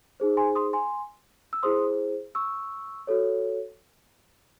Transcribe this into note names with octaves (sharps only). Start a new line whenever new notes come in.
D#4 G#4 C5
G#5 C6
C6 D#6
G#5 C6
E6
E4 G#4 C5 C6 D#6
C#6 E6
F#4 A4 C#5